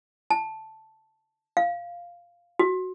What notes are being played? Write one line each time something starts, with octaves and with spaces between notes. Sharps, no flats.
A5
F5
F#4